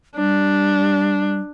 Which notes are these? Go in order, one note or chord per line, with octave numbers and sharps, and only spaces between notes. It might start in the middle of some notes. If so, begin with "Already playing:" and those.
G3 D4